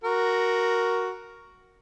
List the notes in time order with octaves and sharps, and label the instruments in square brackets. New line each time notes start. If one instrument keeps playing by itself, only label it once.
[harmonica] F#4 A#4